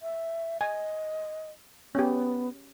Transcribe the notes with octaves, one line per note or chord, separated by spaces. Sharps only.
E5
D#5 G#5
B3 C#4 G4